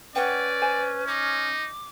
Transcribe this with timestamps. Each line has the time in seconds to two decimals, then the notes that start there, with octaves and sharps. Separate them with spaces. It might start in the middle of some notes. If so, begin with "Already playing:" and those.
0.16 C#4 B4 D5 F#5 G5
0.62 C5 G#5
1.07 D#4 D6